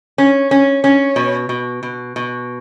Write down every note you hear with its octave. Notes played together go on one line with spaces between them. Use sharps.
C#4
C#4
C#4
B2
B2
B2
B2